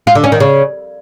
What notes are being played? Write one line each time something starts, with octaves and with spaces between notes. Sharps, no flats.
F4
D3
C#4
D#3
C#3